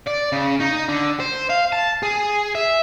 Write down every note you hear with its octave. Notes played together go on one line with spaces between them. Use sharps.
D5
C#3
D#4
D3
C5
F5
A5
G#4
E5